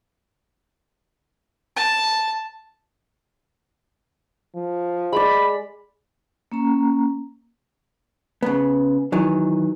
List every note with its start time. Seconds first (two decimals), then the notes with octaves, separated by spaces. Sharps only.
1.76 A5
4.56 F3
5.12 G#3 D5 B5
6.52 A#3 C#4 A#5
8.43 C#3 B3
9.12 D#3 E3 F#3